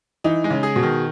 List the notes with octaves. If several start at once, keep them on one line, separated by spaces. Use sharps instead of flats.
E3 D#4
G#3
C#3
G#4
B2
D#3